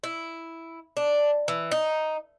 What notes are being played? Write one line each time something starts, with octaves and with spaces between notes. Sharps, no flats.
E4
D4
E3
D#4